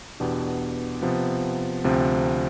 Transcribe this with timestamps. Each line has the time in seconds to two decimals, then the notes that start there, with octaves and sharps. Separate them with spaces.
0.20 E2 B2 B3 D4 G4
1.02 C3 F3 B3
1.84 D2 C3 F3 C4